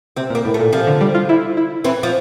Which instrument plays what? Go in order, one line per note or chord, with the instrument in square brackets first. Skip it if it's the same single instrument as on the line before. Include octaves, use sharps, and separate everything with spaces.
[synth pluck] C3 [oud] C4
[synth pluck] A#2 [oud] A#3
[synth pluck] A2
[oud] A3
[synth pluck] A#2
[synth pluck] C3 [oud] F3
[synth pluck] D3
G3
F4
E4
E4
[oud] E3 [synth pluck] C4
[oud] F3